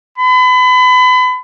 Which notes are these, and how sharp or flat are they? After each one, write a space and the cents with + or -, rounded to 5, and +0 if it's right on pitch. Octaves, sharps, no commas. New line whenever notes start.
B5 +35